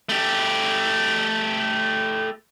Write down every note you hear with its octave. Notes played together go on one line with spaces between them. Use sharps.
A3 G4